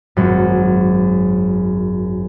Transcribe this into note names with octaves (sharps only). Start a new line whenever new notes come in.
G#1 F#2